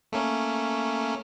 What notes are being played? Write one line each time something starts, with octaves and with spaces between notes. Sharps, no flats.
A3 A#3 C#4